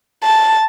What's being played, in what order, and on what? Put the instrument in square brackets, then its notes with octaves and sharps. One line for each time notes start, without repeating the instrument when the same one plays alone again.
[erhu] A5